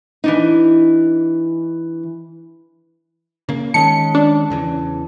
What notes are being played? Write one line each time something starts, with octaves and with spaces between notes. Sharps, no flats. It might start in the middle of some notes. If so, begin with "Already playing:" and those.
E3 D4 D#4
C#3 A#3
D#3 G#3 C#4 A5 C#7
D4
E2 C#3 E3